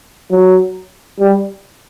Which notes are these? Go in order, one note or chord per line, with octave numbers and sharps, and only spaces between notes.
F#3
G3